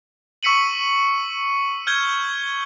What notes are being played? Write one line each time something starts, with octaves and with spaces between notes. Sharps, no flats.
C#6 E6 B6 C#7 D#7 F#7
F6 G6 G#6 G7